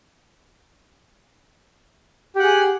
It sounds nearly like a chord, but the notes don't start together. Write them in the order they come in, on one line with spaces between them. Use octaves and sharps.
G4 F#5 G#4